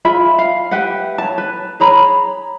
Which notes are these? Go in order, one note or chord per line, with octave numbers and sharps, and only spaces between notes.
F4 G#4 E5 B5
F5
G4 B4 E5 F#5
C#5 A5
B4
G#4 C#5 A#5 B5